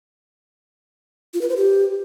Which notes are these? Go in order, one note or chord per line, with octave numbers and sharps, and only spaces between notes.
F4
B4
C5
G4